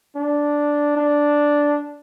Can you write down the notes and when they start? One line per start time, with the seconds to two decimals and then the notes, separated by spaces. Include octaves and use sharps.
0.16 D4
0.96 D4